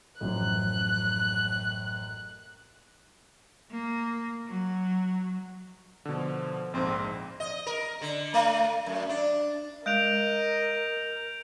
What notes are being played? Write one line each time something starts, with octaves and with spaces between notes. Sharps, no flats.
A1 F#2 F3 F#6
A#3
F#3
B2 D3 F3
A#1 F2 G#2 C4
D#5
A#4
D3
A3
F#2
D4
G#3 A#4 D#5 G6 D7 F7